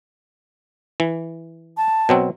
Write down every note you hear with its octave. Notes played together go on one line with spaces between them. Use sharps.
E3
A5
B2 F#3 C4